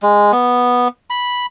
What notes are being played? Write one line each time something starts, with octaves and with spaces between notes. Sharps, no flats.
G#3
B3
B5